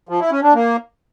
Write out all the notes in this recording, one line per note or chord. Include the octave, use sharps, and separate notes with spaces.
F3
E4
C#4
D4
A#3